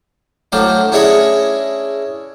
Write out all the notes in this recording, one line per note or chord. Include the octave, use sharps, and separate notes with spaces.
A2 F#3 D4 C5 F5
C#4 D4 E4 G#4 C#5 D#5